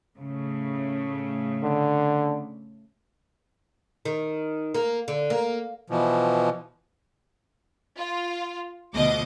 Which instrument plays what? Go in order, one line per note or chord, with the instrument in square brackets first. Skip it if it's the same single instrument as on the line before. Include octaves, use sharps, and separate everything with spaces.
[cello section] A2 C#3 A3
[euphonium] D3
[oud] D#3
A#3
D3
A#3
[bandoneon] B2 E3 F3
[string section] F4
D2 B2 F3 D#5 D6